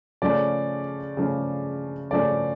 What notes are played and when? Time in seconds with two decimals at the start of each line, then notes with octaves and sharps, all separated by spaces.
0.22 C#3 F3 A3 C#4 D5
1.17 C#3 F3 A3 C#4
2.11 C#3 F3 A3 C#4 D5